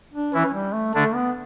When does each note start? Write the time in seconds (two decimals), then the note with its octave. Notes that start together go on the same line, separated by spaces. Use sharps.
0.13 D4
0.33 E3 C#4 E4
0.54 G3
0.74 A3
0.94 D3 A3 D4
1.15 B3